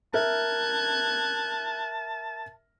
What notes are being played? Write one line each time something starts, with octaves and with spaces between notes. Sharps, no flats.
A#4 E5 A5 F#6 G#6